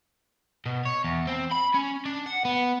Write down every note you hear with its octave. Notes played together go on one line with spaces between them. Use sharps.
B2
C#5
E2
C4
B5
C#4
D4
F#5
B3